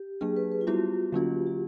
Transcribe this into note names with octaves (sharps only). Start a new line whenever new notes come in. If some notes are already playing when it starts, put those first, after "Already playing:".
Already playing: G4
F#3 A#3 D4 G#4
B4
B4
F4
G3 B3 E4 F#4 G4
D3 F#3 A#3 C#4 F4 G4
G4